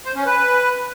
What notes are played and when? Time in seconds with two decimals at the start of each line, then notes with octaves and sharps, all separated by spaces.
0.05 C5
0.15 C#4
0.26 B4